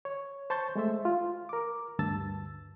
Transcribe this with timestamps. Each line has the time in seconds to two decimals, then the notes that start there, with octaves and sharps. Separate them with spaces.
0.05 C#5
0.50 C5 A5 C6 C#6 G6 A6
0.76 G#3 A3 C5 E5
1.05 F4
1.49 A#4 D6
1.99 D2 G2 A5 E6 A6